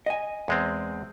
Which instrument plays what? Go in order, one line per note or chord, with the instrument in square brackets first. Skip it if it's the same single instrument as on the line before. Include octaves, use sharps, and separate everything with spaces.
[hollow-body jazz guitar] D#5 G#5
[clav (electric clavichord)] E2 G#3 C4